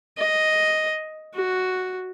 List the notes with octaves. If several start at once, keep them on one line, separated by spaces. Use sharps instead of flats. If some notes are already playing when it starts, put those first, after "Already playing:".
D#5
F#4